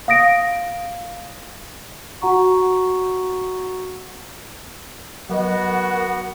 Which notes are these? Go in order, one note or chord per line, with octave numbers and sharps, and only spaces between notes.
F5 D#6 A#6 D7
F#4 F#5 A#5 C#6
F#3 B3 F#4 A#4 D#5